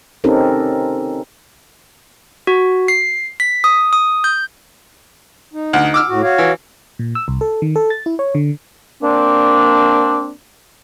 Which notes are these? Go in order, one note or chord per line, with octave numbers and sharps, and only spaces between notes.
C4 C#4 D#4 G4 A4 A#4
F#4
C7
B6
D#6
D#6
G6
D#4
D2
D6 E6 F6
A2 F#4
F#4 C#5 F5
E3
A#2
E6
C2
A4
D#3
A4
A6
E4
C#5
D3
A#3 C4 D4